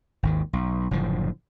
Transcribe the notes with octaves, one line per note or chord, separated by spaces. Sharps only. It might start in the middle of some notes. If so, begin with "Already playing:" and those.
G#1 D#2 D#3
B1
F#1 A2 D3 F3